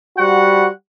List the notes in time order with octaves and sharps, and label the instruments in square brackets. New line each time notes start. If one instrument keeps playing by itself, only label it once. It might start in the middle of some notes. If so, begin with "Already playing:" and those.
[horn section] G3 F#4 C5 F#5